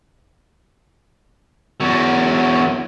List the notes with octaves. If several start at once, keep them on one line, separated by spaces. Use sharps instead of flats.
E2 F#3